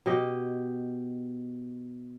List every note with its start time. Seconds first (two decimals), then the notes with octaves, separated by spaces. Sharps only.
0.06 B2 G4 D#5 G5